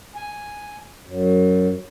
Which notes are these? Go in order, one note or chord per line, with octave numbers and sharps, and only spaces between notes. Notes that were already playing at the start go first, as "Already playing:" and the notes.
G#5
F#2